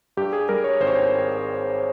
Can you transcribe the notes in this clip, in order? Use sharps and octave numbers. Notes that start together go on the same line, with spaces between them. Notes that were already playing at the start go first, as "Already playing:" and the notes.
G2 G4
G#4
G3 A#4
C#5
G#1 C5
C#5
C5